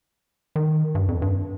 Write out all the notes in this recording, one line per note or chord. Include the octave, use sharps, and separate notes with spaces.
D#3
G2
F2
G2